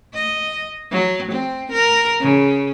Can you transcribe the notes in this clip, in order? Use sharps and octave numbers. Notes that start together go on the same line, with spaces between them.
D#5
F#3
C4
A#4
C#3